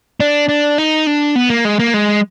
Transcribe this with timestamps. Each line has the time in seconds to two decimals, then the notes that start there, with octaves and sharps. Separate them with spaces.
0.20 D4
0.49 D4
0.78 D#4
1.07 D4
1.36 B3
1.50 A#3
1.65 G#3
1.79 A#3
1.94 G#3